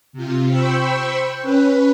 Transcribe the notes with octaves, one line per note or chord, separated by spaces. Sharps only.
C3 F4
C5 G5 B5 C#6 E6
C#4 B4